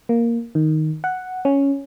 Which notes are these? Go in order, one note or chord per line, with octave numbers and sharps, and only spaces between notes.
A#3
D#3
F#5
C#4